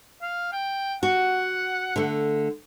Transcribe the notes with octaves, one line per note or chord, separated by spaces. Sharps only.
F5
G5
F#4 F#5
D3 A3